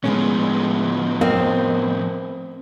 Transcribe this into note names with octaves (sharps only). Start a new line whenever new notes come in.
A2 D3 F3 G#3 B3 C#4
C4 A#4 D#5 F5